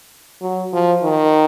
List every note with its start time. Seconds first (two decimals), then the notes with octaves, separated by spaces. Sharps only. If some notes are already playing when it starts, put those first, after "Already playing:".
0.42 F#3
0.73 F3
1.03 D#3